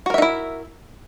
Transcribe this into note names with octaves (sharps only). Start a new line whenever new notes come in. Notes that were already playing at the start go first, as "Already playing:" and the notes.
D#4 E4 F#4 A#4 E5